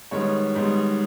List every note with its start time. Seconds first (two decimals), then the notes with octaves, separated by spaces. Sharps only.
0.11 G#2 D#3 G3 B3 C#5
0.55 G#2 D#3 G3 B3